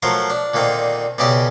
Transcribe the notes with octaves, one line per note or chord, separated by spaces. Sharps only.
F3 F#3 A3 A#4 C6
D4
A#2 D3 D#3 A#3 C4
B1 C#3 G4 D5 D#5 D6